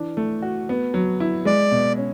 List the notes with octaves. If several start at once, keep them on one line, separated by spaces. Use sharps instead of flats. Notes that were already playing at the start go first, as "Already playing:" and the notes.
Already playing: E3 D4
A3
F#4
B3
F#3
E4
G#3 D5
B2
C#4